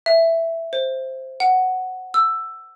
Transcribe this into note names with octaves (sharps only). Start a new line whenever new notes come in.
E5
C5
F#5
E6